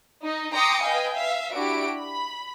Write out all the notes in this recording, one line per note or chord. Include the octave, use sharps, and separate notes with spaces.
D#4
G5 A#5 C6 D6 D#6 C#7
B4 D#5 F5 G5 G#5
E5 F5
D4 E4 F#4 G4 D7
B5